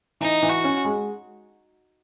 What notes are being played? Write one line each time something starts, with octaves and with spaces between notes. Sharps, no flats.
E3 D#4
E3
F#4
C#4
G#3